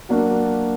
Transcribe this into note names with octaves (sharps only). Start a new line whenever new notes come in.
F#3 A#3 D4 F#4